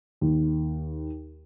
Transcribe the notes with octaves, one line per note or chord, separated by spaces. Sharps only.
D#2